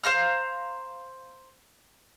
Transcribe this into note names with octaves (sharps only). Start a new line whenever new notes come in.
C5 F5 A#5 F6